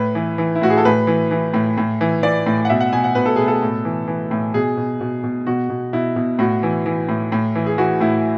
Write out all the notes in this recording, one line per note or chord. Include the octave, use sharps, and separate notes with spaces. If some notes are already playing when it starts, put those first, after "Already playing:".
Already playing: A2 B4
E3
E3
E4
A2 F#4
G#4
A4
A2 B4
E3
E3
A2
A2
E3
E3 D5
A2
F#5
B2 E5
F#5
B2 G#5
F#5
B2 B4
A4
B2 G#4
A4
A2
E3
E3
A2
B2 G#4
B2
B2
B2
B2 F#4
B2
B2 E4
B2
A2 F#4
E3
E3
A2
A2
E3
G#4
E3 F#4
A2 E4